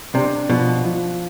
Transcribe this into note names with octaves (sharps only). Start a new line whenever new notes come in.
C3 D4
B2 F3
F3